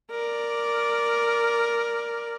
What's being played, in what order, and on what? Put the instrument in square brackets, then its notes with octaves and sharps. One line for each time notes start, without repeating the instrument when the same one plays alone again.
[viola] A#4 D5